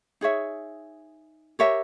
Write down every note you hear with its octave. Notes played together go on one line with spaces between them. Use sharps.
D#4 G#4 C#5 E5
G4 A#4 C#5 E5